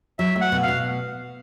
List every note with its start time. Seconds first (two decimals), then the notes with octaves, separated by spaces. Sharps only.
0.19 F#3 E5
0.36 A3
0.41 F#5
0.52 B2
0.63 F5
0.68 B2